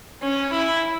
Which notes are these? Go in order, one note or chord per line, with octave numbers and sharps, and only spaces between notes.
C#4
E4